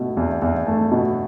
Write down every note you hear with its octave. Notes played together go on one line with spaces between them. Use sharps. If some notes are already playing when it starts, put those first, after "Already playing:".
Already playing: B2 A3
E2
E2
A3
B2